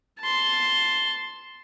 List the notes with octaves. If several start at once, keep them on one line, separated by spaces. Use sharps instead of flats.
A5 C6